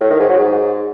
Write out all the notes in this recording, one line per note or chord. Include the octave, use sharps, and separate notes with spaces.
A2
D#3
G#2
F#3
G#2